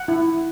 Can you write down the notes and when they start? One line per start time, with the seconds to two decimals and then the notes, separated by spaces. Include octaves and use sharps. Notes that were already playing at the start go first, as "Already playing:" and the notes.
Already playing: F#5
0.08 E4